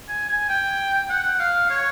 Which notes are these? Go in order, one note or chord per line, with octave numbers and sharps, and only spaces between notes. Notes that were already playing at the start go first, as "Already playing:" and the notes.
G#5
G#5
G5
F#5
F5
C#5